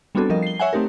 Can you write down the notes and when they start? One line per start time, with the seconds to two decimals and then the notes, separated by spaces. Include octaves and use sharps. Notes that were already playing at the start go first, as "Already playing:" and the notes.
0.15 G3 B3 C4 D4 F#4 A4
0.30 F3 G3 A#4 D#5
0.43 C7 G7
0.60 C#5 E5 F#5 G#5
0.73 A3 C4 D#4 G4 A#4